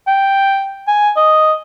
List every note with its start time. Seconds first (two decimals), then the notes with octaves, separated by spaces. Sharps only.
0.07 G5
0.87 G#5
1.16 D#5